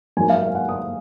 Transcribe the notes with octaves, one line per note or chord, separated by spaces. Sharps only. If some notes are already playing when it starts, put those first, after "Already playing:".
G#2 F#3 A#3 G#5
F5
F5
F#5
D#6